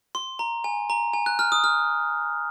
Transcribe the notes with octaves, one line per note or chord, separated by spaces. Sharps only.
C6
A#5
G#5
A#5
G#5
F#6
F6
D#6
F6